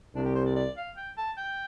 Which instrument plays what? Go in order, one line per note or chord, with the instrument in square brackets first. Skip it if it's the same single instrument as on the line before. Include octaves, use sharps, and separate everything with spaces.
[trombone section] C2 C3 [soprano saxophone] D4
[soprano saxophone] G4
C5
D5
D5
F5
G5
A5
G5